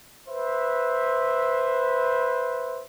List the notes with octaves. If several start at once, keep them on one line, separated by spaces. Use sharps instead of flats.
B4 C5 E5